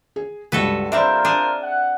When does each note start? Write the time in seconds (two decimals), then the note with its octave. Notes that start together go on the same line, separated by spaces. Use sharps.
0.16 G#4
0.52 C#2 G2 F#4 A4 B4
0.92 G3 C4 D4 F4 A#4 C5 E5
1.25 D4 G#4
1.62 F#5